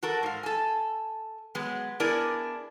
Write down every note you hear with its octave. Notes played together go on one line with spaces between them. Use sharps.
F#4 A4 A#4
G#2 F5
A4 G#5
F#3 G#3 B3
B3 D4 E4 G#4 A#4 D5